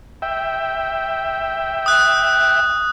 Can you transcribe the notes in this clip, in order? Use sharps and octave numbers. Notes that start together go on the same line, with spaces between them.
E5 G5
D#6 F#6